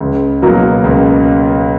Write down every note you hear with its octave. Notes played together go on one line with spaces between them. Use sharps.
C#2
B2 F#3 A#3
C#2